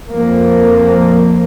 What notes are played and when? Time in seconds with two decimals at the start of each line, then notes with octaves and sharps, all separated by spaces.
0.14 F2 F3 A#3